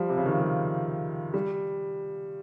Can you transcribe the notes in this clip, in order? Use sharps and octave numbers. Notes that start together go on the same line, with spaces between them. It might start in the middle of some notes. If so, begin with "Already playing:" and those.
Already playing: F3 G3
C3
C#3
D#3
F3
G3
G3